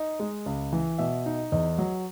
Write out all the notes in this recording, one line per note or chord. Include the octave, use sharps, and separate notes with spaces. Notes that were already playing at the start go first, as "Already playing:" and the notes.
Already playing: D#4 D#5
G#3
C#2
E3
B2 E5
D#4
E2 D#5
F#3